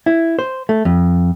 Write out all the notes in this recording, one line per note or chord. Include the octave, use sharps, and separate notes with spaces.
E4
C5
A3
F2